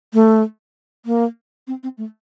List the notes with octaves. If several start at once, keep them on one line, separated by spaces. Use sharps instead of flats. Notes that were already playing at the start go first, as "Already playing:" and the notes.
A3
A#3
C4
C4
A3